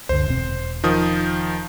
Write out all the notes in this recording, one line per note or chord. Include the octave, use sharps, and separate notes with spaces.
C#2 F#2 D3 C5
E1 B2 C4
D#3 F3 D#6